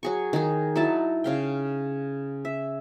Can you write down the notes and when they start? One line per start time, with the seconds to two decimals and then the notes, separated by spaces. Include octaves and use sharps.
0.03 F#3 G#4 C#6
0.33 D#3 D#4 G#4
0.76 F#3 D#4 E4 A5
1.24 C#3 F5 G5
2.45 E5